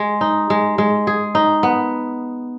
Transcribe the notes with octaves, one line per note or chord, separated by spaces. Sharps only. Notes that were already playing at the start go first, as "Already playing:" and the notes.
Already playing: G#3
D#4
G#3
G#3
G#4
D#4
B3